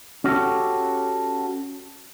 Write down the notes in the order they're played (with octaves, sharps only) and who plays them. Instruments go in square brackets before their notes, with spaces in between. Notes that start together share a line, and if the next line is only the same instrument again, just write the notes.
[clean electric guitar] C#4 F#4 G4 A4